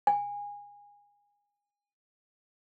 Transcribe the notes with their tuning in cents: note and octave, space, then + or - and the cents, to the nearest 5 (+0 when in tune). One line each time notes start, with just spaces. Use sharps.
G#5 -25